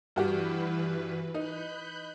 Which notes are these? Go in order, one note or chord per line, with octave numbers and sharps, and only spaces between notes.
G2 E3 F#4 G4 B4
D#4 B5 F#6 G6